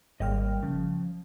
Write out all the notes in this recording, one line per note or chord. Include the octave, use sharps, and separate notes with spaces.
G#1 G3 A#3 D#5 G5 F6
C#3 F3